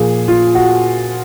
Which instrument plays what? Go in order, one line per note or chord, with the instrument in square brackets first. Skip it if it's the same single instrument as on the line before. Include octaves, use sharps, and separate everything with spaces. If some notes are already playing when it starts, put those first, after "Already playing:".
Already playing: [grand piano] A#2 F3 G#4
F4
F#4